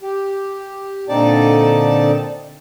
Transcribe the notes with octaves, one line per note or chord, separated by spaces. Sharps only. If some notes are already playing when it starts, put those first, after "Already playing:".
G4
A#2 D3 C4 D#4 D5 A5